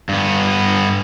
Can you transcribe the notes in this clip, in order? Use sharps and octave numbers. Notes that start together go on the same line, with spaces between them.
G2 B3